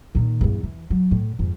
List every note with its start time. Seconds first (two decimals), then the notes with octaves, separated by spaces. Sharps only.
0.15 A#2 D#3
0.41 E2 G2
0.63 E3
0.90 F#3
1.11 A2
1.39 F2 G#2